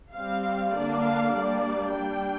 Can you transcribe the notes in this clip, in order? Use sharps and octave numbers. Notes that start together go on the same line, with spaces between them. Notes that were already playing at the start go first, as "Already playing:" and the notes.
G3 C4 F5
D3 A#3 D4 D5
F5
G3 A#3 D4 D5
G3 D4 G5